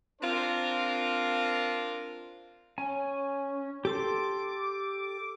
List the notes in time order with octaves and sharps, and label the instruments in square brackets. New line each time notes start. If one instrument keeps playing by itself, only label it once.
[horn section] C4 D4 F4 A#4 C5
[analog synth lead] C#4 [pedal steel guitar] G#5
[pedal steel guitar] G4 A4 C6 [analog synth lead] D6